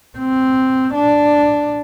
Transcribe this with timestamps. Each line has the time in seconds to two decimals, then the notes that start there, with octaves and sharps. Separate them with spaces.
0.18 C4
0.94 D4